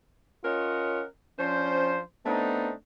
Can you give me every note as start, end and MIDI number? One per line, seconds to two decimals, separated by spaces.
0.44 1.04 61
0.44 1.04 65
0.44 1.04 70
0.44 1.04 73
0.44 1.04 75
0.44 1.04 78
1.39 2.00 53
1.39 2.00 61
1.39 2.00 62
1.39 2.00 72
2.26 2.72 57
2.26 2.72 59
2.26 2.72 60
2.26 2.72 62
2.26 2.72 63